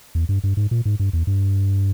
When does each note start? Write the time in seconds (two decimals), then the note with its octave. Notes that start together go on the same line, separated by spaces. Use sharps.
0.15 E2
0.29 G2
0.44 G2
0.57 G#2
0.71 A#2
0.86 G#2
1.00 G2
1.13 E2
1.27 G2